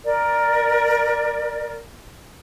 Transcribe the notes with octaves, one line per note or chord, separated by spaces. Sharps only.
A#4 D5